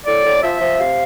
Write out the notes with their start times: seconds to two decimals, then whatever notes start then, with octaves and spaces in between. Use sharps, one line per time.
0.06 A2 D5
0.24 A2
0.43 F3 E5
0.60 F3
0.79 C3 F5